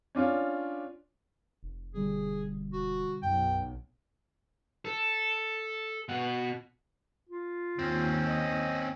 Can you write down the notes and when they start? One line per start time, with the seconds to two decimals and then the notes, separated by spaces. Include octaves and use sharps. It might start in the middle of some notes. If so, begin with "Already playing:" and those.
0.15 C#4 D4 F4 C#5
1.63 F1
1.94 B2 D3 G3 G#4
2.73 E1 F#4
3.23 B1 F#2 G5
4.85 A4
6.09 B2 F#5
7.29 F4
7.79 D#2 C4 C#4
8.24 D#5